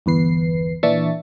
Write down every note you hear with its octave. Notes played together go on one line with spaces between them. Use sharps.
G1 E2 B4 C7
A#2 E3 D4 E5 C#6 A6